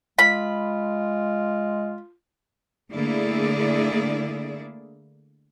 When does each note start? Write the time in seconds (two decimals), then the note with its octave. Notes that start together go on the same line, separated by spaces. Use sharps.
0.19 G#3 F4 B5
2.91 D3 A3 A#3 E4 G#4 D5